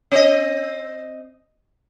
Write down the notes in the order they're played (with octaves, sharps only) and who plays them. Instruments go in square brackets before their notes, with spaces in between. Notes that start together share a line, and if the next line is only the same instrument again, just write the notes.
[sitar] C4 D#5